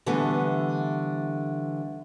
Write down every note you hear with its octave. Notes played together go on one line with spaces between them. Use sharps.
D3 E3 G3 A3 B3